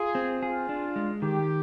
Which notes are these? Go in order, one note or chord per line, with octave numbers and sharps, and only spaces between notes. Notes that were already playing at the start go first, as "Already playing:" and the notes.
Already playing: F4 G#4
C4
F4 G#4
D4
G#3
D#3 G4